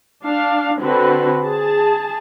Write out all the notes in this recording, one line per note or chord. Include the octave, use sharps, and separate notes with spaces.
D4 F5
D3 C4 F#4 B4
G#4 A5